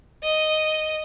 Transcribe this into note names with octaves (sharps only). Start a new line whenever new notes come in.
D#5